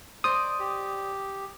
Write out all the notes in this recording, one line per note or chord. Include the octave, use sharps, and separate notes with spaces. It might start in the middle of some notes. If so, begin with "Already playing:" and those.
C5 D5 D#5 D#6
G4